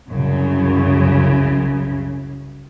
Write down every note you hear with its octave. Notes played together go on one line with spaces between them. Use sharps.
C2 F#2 C#3